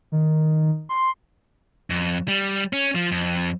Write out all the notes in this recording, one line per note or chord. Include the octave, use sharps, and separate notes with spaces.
D#3
C6
F2
G3
C#4
F3
F2